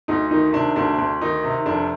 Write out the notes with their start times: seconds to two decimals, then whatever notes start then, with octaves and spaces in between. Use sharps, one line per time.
0.08 D2 D#4
0.31 D#3 D#4
0.53 C3 D4
0.76 D2 D4
0.98 D2
1.21 D#3 D#4
1.44 C3
1.66 F1 D4